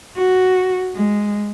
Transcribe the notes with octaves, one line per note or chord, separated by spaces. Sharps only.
F#4
G#3